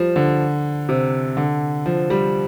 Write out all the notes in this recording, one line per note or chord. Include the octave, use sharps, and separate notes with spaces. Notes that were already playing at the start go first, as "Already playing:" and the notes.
Already playing: F3 G3
D3
C3
D3
F3
G3